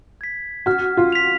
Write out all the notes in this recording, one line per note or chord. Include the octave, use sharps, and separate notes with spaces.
G#6 B6
F#4 F6
F4
B6 F7